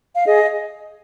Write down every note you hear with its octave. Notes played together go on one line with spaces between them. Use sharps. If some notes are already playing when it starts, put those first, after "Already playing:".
F5
G#4 D#5